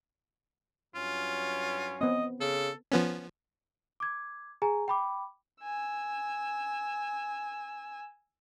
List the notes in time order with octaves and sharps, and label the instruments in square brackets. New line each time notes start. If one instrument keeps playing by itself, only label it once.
[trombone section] G2 F#3 C#4 [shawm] F4
[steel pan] B3 C4 [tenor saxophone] D#5
[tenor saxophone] C#3 [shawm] A4
[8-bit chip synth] F3 B3 C#4
[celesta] D6 G#6
G#4 G#5 A#5
G5 B5 D6
[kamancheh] G#5 E6